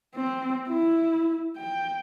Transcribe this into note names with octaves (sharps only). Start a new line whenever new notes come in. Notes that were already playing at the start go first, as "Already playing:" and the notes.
C4
E4
G5